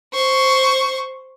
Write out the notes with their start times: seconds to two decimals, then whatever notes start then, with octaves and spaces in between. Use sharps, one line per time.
0.13 C5 C#6